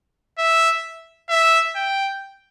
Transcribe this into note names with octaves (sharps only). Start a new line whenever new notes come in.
E5
E5
G5